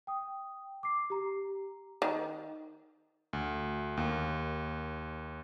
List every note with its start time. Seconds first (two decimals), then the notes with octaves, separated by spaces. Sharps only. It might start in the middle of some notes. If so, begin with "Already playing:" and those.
0.07 G5 D#6
0.83 D6 C7
1.10 G4 A#5
2.02 D#3
3.33 D2
3.97 D#2